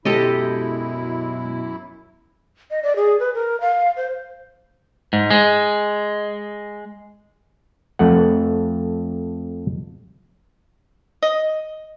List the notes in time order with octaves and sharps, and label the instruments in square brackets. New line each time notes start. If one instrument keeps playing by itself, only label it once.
[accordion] F#2 E4 [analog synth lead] B2 [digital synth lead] G#3 [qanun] G4 A4 D#5
[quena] D#5
D5
G#4
B4
A#4
F5
C5
[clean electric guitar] G#2
G#3
[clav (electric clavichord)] F2 A3 F#5
[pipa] D#5